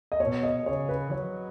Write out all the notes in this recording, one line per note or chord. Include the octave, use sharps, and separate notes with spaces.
D#5
B2 C#5
D#5
C#3 C#5
B4
F#3 C#5